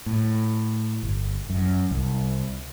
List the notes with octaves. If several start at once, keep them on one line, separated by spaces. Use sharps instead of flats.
A2
G1
F#2
C2